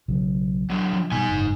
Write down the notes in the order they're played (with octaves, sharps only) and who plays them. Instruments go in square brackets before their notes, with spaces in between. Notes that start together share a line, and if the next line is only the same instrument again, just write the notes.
[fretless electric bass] B1 C#3 F#3
[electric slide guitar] D3 F#3
[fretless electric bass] F3
[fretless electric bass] B2 F3 G3 [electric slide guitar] D#4 G#5
[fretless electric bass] F#1 G#2